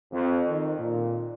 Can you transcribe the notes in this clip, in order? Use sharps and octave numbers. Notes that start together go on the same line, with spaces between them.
F2
D#3
A#2